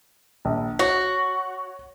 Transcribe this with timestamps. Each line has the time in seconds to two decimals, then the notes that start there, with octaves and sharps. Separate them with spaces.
0.45 A#1
0.79 F#4 C#5